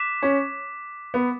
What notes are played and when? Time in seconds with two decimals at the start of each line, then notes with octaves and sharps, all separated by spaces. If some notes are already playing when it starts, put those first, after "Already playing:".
Already playing: D6 F#6 B6 E7
0.22 C#4
1.14 B3